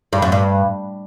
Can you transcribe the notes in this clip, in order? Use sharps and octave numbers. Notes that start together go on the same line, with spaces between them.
G2
F#2
G2